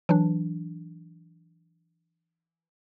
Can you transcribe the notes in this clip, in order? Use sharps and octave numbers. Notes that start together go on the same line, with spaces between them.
E3 F#3 D4